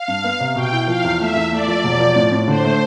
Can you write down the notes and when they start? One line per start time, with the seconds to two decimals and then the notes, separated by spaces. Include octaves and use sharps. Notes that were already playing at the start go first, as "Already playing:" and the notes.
Already playing: F5
0.08 G2
0.24 B3
0.40 C3
0.56 B2 G5
0.72 E4
0.88 F3 F5
1.04 E2
1.20 A3 E5
1.36 E2
1.52 A3 D5
1.68 F3
1.84 E1
2.00 F3
2.16 A2
2.32 A2
2.48 D3 C5
2.64 A3